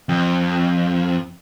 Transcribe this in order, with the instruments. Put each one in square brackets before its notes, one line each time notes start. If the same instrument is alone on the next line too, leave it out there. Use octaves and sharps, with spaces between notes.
[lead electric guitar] F2